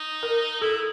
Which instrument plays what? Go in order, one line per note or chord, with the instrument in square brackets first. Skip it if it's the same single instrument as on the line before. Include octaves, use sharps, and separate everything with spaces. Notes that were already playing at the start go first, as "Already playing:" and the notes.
Already playing: [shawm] D#4
[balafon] A#4
[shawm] E4 [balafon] A4